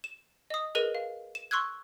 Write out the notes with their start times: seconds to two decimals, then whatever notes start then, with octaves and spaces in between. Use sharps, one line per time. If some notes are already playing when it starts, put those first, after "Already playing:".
0.04 E7
0.50 D#5 D#6
0.75 G#4 A#4 B4 D#5 D#7 G7
0.95 F5
1.35 E7
1.51 C6 C#6 E6 F#6 G#6